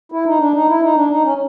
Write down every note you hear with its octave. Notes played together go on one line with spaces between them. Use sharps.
E4
D#4
D4
D#4
E4
D#4
D4
D#4
C#4